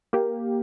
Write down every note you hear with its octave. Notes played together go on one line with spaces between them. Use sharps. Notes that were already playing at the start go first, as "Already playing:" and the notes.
A#3 G4